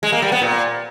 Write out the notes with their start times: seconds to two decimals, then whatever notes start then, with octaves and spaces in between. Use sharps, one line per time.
0.03 G#3
0.12 A#3
0.22 G3
0.32 B3
0.42 A#2